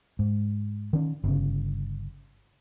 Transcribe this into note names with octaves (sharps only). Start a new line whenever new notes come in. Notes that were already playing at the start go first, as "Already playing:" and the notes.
G#2
D#3 C#4
G1 C#3